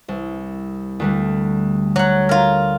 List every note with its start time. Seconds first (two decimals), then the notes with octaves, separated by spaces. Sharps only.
0.08 C2
1.00 D2 D3 G3
1.96 F#3 F#5
2.29 F4 A#4